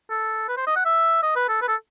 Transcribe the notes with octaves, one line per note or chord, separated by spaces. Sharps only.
A4
B4
C5
D#5
F#5
E5
D#5
B4
A4
B4
A4